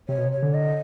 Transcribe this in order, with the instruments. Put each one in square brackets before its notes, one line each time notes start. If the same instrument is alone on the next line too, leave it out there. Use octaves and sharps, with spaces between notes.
[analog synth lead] C3 [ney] C#5
[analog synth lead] B2
C3
[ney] C#5
[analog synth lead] D3
[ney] D#5